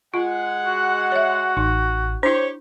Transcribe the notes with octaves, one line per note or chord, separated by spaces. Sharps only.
G#3 F4 F#5
F#4
C#5 E5
A1 D#4
D4 E4 G4 C5 C#5